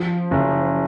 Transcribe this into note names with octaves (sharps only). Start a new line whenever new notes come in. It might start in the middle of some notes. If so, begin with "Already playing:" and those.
Already playing: F3
F#1